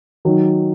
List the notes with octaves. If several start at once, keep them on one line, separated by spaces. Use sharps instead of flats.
D#3 F#3